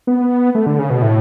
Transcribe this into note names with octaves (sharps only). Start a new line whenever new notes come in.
B3
A3
D3
C#3
B2
A2